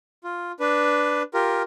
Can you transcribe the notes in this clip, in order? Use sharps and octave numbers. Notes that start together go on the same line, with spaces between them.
F4
D4 B4
F4 G4 A#4